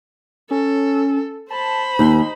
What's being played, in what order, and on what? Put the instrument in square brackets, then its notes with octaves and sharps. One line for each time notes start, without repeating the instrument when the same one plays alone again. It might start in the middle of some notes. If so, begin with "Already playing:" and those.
[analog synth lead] C#4 [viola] A4
[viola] C5 B5 [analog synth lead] A5
[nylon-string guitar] D#2 [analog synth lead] D#4